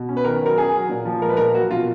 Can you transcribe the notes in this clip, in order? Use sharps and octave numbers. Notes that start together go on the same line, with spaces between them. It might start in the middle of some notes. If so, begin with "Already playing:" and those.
Already playing: B2
C#4
B4
D#3 A#4
F#3 A#4
C#4 G#4
F#3
A#2
F3
G#3 A#4
B4
A#2 A#4
F#3 F#4
B2 F4